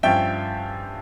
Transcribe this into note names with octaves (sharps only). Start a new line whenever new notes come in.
G2 F3 C#4 E5 G5